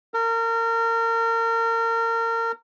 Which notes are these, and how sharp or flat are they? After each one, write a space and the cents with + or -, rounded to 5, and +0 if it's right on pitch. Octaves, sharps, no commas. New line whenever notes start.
A#4 -30